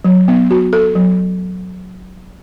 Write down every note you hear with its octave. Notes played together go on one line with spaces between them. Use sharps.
F#3
B3
F#4
A4
F#3